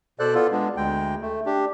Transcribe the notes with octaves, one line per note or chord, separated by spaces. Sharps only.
B2 A4 C5 D5 F#6
B3 F4 A4
G#3 B3 D4
D2 G#3 G5
A3
D4 G4